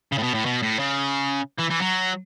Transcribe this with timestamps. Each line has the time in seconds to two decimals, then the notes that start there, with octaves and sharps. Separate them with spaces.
0.12 C#3
0.18 A2
0.23 B2
0.34 A2
0.46 B2
0.63 A2
0.80 C#3
1.59 E3
1.71 E3
1.82 F#3